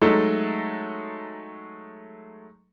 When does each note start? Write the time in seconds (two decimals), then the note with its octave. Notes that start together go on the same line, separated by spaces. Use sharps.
0.02 F#3 G#3 A3 D#4 A4